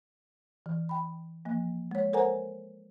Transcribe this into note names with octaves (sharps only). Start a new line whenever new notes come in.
E3
G5 B5
F3 A#3
G#3 C#5
A4 A#4 C5 F#5 G#5 A#5